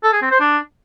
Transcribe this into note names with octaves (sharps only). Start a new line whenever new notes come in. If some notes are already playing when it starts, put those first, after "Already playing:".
A4
G#4
C4
C5
D4